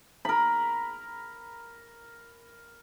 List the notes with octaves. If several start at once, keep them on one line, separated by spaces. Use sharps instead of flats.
A#4 B5